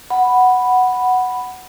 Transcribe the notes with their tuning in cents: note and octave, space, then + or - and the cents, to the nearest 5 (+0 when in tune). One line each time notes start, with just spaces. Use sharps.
F#5 +0 B5 +0